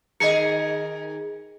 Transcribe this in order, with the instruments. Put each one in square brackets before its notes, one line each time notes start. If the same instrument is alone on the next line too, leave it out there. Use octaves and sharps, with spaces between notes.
[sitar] D#3 G#4 A#4 [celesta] D#5 C#7